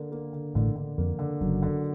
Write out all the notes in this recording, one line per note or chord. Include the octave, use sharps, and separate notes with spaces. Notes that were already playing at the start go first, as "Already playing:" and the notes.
Already playing: D3 A#3
A#3
D3
A1 A2 D3
D3
F2 A#3
D3
F#1 F#2 F#3
D3